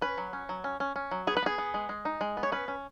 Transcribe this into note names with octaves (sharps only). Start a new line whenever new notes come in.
C#4 B4
F#3
C#4
F#3
C#4
C#4
C#4
F#3
B3 G#4
B4
B3 G#4
B3
G#3
G#3
D#4
G#3
B3
C#5
C#4 B4
C#4